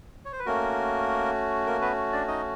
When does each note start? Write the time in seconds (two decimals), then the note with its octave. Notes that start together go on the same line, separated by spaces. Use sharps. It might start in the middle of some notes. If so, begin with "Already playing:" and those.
0.25 C#5
0.32 C5
0.39 B4
0.46 A3 A#3 C#4 F#4 A#4
1.66 A#3 A#4
1.82 B3 B4
2.12 D4 D5
2.28 D#4 D#5